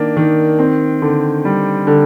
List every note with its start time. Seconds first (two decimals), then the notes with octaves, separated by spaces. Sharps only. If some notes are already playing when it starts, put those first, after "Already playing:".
Already playing: D#3 A#3 D4
0.16 D#3
0.59 C4
1.02 D3
1.45 G3
1.87 D3